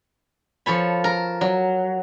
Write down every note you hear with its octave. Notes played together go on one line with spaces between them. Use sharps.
F3 A4 C#5 B5
A#4
F#3